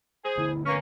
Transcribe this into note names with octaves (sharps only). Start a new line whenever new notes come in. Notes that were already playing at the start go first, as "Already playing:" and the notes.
G#4 C5
D3 A3 B3 E4
A#3 C#4 B4 C#6